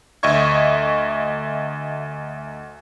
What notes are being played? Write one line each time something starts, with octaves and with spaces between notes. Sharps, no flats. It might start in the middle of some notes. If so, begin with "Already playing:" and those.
D2 D#5 E5 C#6 G#6